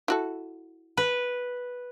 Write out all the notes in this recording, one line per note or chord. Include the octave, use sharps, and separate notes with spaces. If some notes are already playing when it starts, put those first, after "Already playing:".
E4 F#4 A4
B4